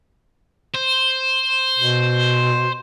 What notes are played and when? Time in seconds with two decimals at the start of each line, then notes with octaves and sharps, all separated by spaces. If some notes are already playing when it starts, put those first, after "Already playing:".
0.75 C5
1.79 B2